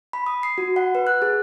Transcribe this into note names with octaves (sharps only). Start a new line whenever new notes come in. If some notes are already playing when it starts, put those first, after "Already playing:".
B5
D#6
C7
F#4
F#5
B4
F#6
G#4